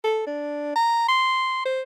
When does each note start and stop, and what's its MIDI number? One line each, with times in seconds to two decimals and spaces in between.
0.04 0.23 69
0.27 0.72 62
0.76 1.04 82
1.09 1.62 84
1.65 1.82 72